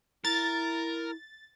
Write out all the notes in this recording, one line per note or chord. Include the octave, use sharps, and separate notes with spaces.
E4 A#4 A6